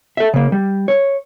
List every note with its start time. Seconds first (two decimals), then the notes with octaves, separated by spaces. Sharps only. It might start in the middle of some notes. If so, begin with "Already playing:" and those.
0.17 A4 E5
0.34 C#3 A#3
0.52 G3
0.88 C#5